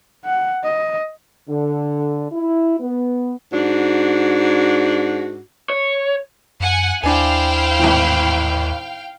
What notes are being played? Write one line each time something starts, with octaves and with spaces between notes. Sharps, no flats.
F#5
D#5
D3
E4
B3
G#2 D4 F#4
C#5
F#2 F#5 G#5
D#2 D4 E4 C5 F5 G5 G#5
G#1 A2 E3